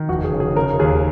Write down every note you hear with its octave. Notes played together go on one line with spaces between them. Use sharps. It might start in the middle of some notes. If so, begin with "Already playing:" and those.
Already playing: D#3
F1 F#4
G#4
C#3
G#4
C#3 A#4
D#2 G#4